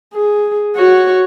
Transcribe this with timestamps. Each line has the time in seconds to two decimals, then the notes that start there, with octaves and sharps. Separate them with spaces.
0.14 G#4
0.75 F#4 C#5